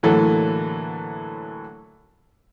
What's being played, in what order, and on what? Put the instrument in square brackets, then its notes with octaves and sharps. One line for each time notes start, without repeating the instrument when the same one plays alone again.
[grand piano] A2 D3 E3 F#3 A#3 A4